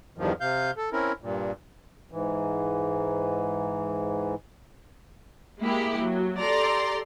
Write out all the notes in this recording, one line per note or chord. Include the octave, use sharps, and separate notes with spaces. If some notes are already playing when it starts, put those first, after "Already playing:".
E2 G2 D#3 F3
C3 F5 G6
A4
C4 C#4 E4 A#4
G2 A#2
G#2 E3
G#3 A#3 E4 G4
F#3
G4 A4 D5 A#5 C6